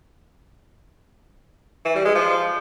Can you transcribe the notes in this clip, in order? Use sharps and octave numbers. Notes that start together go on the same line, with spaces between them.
E3
G3
G#3
F3